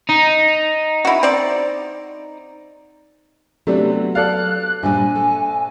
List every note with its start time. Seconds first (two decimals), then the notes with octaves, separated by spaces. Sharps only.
0.10 D#4
1.05 E4 F#4
1.23 C4 D5
3.67 C3 F#3 A3 B3 D4
4.15 A4 D5 F5 F#6
4.83 A#1 G2 A#2 G3 G#5
5.16 A4